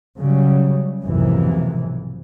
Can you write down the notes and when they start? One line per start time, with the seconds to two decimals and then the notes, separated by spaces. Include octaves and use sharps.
0.19 C#3 F#3 G3
1.03 B1 F2 G#2 C3 E3 A#3